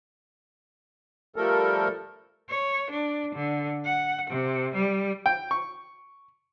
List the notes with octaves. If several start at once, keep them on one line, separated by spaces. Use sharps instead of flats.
F3 G3 A3 A4 A#4
C#5
D4
D3
F#5
C3
G3
G5
C#6